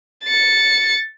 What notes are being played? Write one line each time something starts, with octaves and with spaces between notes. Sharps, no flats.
A6 C#7